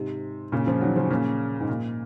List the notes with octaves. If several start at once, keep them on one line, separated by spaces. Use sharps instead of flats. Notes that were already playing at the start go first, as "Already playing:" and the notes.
Already playing: G#2 C3
A#2 C#3
C#3 F3
D#3 F#3
C#3 F3
A#2 C#3
G#2
A#2